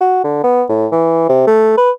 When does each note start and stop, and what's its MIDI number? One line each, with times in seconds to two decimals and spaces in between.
0.01 0.19 66
0.24 0.41 50
0.44 0.64 59
0.69 0.87 45
0.92 1.27 52
1.29 1.47 48
1.47 1.74 57
1.78 1.91 71